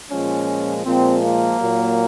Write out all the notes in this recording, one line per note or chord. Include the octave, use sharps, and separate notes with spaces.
A#2 F3 G#3 C#4
A#2 F3 G#3 C4
A#3
A#2 F#3